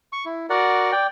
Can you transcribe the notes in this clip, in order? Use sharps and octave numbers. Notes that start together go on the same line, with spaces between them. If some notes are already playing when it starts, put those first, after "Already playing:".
C#6
E4
F#4 A#4 D5 F#5
D5 G5